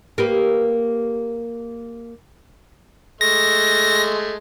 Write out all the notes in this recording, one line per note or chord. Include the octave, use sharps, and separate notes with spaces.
A#3 G4 B4
G#3 A3 A#6